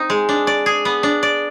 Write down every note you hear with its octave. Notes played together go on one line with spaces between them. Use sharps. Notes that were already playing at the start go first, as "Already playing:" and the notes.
Already playing: C4 D#4
G#3
D4
D5
G#4
B3
D4
D5